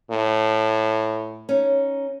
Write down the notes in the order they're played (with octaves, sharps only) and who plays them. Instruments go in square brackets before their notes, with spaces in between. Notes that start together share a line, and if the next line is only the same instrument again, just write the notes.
[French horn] A2
[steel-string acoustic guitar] C#4 D#4